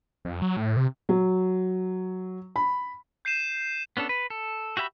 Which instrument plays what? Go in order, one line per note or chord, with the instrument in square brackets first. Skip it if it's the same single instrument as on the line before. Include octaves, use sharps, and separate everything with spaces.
[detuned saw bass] F2
F#3
A2
C3
[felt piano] F#3
B5
[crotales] G6 C7 D#7 E7
[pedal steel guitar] B3 C#4 D4 A4
B4
A4
F#4 G4 E5 G5 B5